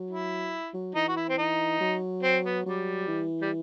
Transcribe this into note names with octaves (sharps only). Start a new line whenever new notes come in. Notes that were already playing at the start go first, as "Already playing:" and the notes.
Already playing: F#3
E4
F#3
E3 D#4
F#4
E4
C4
D#4
F#3
C4
B3
F#3 G3
E3
G3